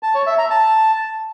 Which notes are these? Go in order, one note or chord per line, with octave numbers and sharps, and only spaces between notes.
A5
C#5
E5
A#5
A5